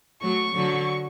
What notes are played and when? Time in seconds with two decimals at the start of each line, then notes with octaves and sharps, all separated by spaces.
0.22 F#3 A3 C#6
0.55 D3 F#3